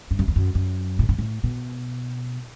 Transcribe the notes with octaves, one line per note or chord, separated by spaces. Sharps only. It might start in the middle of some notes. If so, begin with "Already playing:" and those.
G2
F#2
E2
F#2
F#2
A2
G2
A2
B2